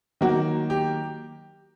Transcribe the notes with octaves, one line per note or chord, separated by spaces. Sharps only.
D#3 F#3 A#3 F#4
G4